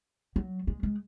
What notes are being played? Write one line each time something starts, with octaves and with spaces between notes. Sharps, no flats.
F#3
G#3
G#3